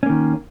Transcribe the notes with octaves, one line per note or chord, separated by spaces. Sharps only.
D#3 A#3 C#4